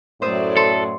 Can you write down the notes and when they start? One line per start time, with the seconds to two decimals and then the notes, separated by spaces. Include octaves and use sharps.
0.22 F#2 A2 F#3 F#4 C5 D5 E5 D#6
0.57 A4 C6 C#7